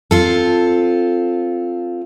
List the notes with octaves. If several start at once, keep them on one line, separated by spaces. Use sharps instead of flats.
C4 F4 A4